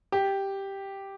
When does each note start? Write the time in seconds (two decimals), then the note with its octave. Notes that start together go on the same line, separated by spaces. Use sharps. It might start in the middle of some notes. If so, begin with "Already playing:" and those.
0.12 G4